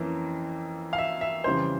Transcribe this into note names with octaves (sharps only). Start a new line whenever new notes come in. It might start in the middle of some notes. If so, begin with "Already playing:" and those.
Already playing: F2 E3 A#3 C#4
F5
E5
E5
F2 C#3 E3 G3 C5